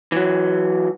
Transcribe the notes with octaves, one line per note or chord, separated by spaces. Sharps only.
E3 F#3